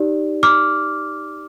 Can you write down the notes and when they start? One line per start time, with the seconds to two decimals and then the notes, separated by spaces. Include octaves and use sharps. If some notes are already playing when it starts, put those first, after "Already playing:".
Already playing: D#4 G4 D5
0.43 D6 F6